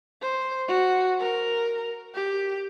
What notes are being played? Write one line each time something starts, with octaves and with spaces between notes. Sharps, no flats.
C5
F#4
A#4
G4